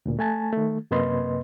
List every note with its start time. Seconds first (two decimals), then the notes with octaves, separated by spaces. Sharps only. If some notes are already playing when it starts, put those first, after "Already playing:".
0.06 D2 A#2
0.19 A3 G#5 A5
0.53 D#3 A3
0.91 F#2 C3 A#3 B4 D#5 C6